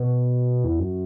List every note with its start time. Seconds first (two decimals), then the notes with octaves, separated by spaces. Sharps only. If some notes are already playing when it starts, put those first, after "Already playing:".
Already playing: B2
0.64 E2
0.79 F#2